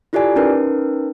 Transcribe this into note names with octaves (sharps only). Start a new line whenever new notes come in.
E4 F4 G4 A4 D5 G#5
C#4 D#4 A#4 B4